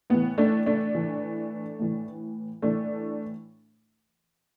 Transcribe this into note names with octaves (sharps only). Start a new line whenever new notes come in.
A2 E3 B3
A3 D4
A3 D4
A2 E3
A2 E3
A2 E3 A3 D4